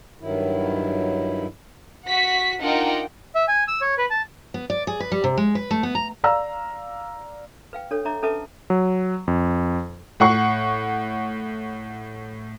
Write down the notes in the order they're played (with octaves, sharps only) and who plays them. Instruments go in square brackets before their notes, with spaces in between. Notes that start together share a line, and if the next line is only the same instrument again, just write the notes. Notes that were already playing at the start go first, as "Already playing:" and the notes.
[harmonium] G2 D#3 F#3 E4
[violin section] F#4 F#5 B6
D4 D#4 F4 A#4 F#5 G5
[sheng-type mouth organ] E5
G#5
E6
C#5
B4
A5
[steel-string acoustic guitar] B3
D5
G#4
B4
G3
C3
G#3
B4
A3
B3
A#5
[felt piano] D5 F5 A#5 E6
[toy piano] B4 F5 G5
D4 A4 C#5
D4 C#5 E5 A#5 D6
C#4 A4 B4 E5 A5 D6
[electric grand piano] F#3
F2
[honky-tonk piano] A2 F#5 C#6 C7